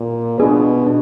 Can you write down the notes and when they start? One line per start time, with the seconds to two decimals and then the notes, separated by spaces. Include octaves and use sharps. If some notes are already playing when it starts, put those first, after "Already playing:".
Already playing: A#2
0.38 B2 D4 F4 G#4 B4
0.87 D4